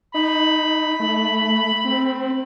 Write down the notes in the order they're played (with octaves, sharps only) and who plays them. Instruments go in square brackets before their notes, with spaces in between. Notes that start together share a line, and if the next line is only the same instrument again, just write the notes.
[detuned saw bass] D#4 [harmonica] B5
[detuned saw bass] A3
C4